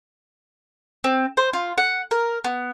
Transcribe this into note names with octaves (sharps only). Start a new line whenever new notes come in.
C4
C5
F4
F#5
A#4
B3